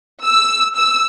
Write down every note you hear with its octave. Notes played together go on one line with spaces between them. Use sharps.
E6
E6